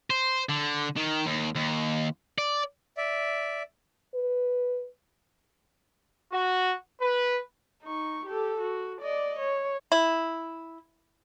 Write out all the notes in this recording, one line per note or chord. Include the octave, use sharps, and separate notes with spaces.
C5
D3
D#3
D#2
D#2
D5
D5 E5
B4
F#4
B4
D#4 C#6
G4 A4
F#4
D5 D#5
C#5
E4